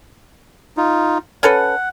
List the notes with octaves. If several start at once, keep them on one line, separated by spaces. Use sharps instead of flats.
D#4 F4
C#4 A4 B4 F#5